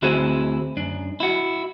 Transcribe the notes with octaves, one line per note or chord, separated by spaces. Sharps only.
D2 C4 E4 F#4 G#4 C5
F#2 D4
E4 F#4